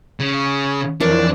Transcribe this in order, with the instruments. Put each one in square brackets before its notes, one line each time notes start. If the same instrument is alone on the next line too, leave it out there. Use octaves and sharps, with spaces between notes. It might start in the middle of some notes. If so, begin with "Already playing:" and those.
[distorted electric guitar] C#3
[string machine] F2 E3 F3 [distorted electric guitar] D4 [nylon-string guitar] E4 A#4 C#5